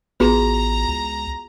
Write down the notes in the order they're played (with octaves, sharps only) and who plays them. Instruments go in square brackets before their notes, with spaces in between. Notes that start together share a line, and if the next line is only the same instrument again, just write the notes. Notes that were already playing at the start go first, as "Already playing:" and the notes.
[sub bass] A1 [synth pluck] B3 [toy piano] F4 F#4 G#4 [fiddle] A#5
[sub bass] C#2